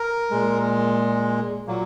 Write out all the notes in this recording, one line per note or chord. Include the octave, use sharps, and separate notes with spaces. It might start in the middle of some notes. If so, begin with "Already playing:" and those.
Already playing: A#4
A#2 G#3
A#2 F#3 A#3